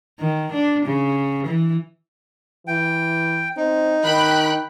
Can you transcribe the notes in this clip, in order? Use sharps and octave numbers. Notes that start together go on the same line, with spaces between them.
D#3
D4
C#3
E3
E3 G5
C4 D#4
D#3 G5 B5 F#6